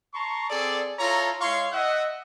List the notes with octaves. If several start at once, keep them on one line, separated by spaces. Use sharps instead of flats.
A5 A#5 C6 C#6
C4 G#4 A4 D5
E4 F4 A4 C#5 A#5
G#3 E4 C#5 F5 C6 C#6
D#5 E5 F#5